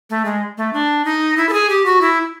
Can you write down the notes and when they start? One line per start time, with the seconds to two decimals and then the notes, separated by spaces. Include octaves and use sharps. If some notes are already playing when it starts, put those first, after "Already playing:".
0.10 A3
0.25 G#3
0.58 A3
0.73 D4
1.05 D#4
1.37 E4
1.49 A4
1.53 G#4
1.70 G4
1.85 F#4
2.01 E4